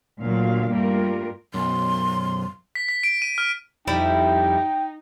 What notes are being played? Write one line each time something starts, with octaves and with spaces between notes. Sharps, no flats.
D2 A#2 D3 F#3 F5
G2 G3 A3 A#3 F4 A#4
B1 F#2 C6
B6
B6
D7
D#7
F6
F2 G3 D#4 E4 G5